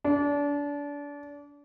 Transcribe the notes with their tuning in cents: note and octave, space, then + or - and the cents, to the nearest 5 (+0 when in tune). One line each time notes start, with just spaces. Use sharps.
D4 -30